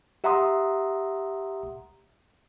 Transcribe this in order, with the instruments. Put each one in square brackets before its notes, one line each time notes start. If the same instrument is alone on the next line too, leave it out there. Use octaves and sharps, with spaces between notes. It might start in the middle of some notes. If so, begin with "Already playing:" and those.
[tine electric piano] G4 E5 F#5 A#5 C6 D#6